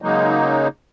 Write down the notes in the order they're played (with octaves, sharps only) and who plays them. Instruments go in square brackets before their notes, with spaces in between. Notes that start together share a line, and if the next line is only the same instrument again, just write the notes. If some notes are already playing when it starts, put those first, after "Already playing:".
[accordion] C#3 F#3 G#3 A#3 D#4